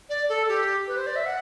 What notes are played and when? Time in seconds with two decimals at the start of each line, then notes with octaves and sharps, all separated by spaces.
0.09 D5
0.29 A4
0.48 G4
0.87 B4
0.97 C5
1.07 D5
1.16 E5
1.26 F#5